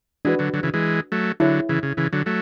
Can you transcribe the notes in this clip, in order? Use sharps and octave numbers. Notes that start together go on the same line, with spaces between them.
E3 G#3 D4 F#4 B4
D3 F#3
D3 F#3
C#3 E3
E3 G#3
F#3 A3
D3 F#3 E4 G#4 C#5
C#3 E3
C#3
C#3 E3
D3 F#3
F#3 A3